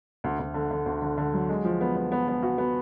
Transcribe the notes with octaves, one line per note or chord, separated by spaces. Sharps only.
D2
D2
D3
D3
D2
D3
D3
F#3
G#3
F3
B3
B3
B3
B3
F#4
B3